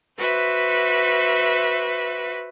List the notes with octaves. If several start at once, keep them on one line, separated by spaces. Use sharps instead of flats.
F#4 B4 C5 E5